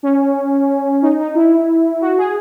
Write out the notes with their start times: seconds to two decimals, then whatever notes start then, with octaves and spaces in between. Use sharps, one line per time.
0.03 C#4
1.02 D#4
1.19 D#4
1.35 E4
2.01 F#4
2.18 G#4